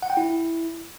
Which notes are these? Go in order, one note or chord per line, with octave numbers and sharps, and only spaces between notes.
F#5
G5
E4